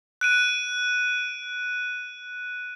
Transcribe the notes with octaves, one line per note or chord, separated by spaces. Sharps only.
F#6 D7 D#7